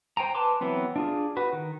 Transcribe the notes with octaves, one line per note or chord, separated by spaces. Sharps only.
C5 G5 G#5 A#5
B4 G#5 A5 C6 D6
E3 F#3 B3 C4
D4 F4 G#4
F#4 B4
D#3